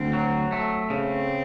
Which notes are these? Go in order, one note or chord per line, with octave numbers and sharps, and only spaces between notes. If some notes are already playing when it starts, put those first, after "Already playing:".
Already playing: D2 C4
F#3
A3
C#3 C4